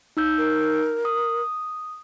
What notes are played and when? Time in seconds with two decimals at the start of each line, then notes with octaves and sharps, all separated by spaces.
0.17 D#4 E6 G6
0.38 A#4
1.05 D#6